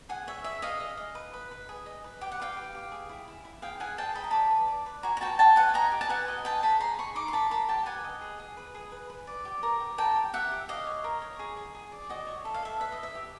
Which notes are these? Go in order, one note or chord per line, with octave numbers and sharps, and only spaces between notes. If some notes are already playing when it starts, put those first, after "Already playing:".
G#4 F#5 G#5
C#5 E5
G#4 E5
G#4 D#5 F5
D#5
D#5
B4
B4
B4
G#4
D#5
B4
G4 G5
F#5
B4 F5 G5
G4
G4
G#4
E4
E4
E4
G#4 F5 G5
G#4 F#5 G#5
G#4 G5 A5
D#5 B5
A#5
D5 A5 B5
B4
D5
B4
F#4 G#5 A#5
A#5
F#4 G5 A5
F#4 G5 A5
B4 F#5 G#5
D#5 G#5 A#5
G4
A5
B4 F#5 G#5
D#5
B4 G5 A5
G#4 A5 B5
G#4 A#5 C6
G#4 B5 C#6
D#4 C6 D6
C6
A#4 A5 B5
A#4 A5 B5
G4 G5 A5
B4 F#5 G#5
D#5
G#4
G#4
B4
G#4
B4
B4
D5
G4
A#4
G4
A#4 G5 A5
G4
G4 E5 F#5
G4
G4 D#5 F5
C#5
A#4
C#5
G#4
G#4
G#4
D5
F#4 D#5
C#5
A4 E5
F5
A4 E5
B4 E5
D#5
E4
E5
G4